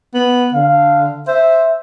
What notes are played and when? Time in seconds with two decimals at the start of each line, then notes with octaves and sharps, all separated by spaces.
0.14 B3
0.54 D3 F5
1.28 C5 E5